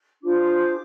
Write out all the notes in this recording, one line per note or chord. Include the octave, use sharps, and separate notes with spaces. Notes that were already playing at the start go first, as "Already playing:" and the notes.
D4 F4 G#4 C5 D6